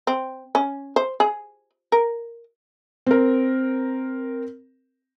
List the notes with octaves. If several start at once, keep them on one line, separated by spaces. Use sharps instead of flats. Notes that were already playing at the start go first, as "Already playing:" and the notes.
C4
C#4
C5
G#4
A#4
C4 A#4